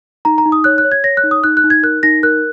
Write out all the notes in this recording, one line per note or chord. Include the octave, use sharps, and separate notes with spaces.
D#4 A#5
A#5
D#4
D#6
C#5 F#6
F#6
C#5
G#6
C#5 A#6
F#6
D#4
D#6
D#4 F#6
F#6
D#4
G#6
A#4 F#6
D#4 A#6
A#4 F#6